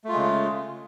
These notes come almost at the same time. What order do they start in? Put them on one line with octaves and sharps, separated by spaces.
A3 F4 G#3 C#3